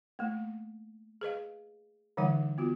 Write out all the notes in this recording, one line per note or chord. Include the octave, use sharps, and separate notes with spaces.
A3 A#3
G#4 B4 D#5 F5
D3 E3 G3 D#4 F#5
B3 F4 F#4